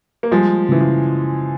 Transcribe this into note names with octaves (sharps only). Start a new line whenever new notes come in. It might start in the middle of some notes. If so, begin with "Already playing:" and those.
A#3
F3 G3 G#3
C#3 E3
F3